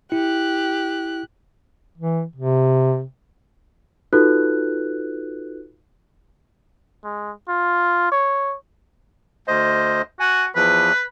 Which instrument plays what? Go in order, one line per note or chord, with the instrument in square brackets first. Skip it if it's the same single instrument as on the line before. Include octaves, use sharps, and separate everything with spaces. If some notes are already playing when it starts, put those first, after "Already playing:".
[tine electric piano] E4 [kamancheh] G4 F#6
[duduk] E3
C3
[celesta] D#4 F4 F#4 A4 B4 F#6
[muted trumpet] G#3
F4
C#5
[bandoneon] D2 C5 D#5
[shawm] F#4 [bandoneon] G#5
[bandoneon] E2 E3 F3 [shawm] B4